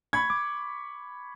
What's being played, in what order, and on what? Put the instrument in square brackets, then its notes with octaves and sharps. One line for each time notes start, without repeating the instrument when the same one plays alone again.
[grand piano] B5 C#6 G#6
[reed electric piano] D6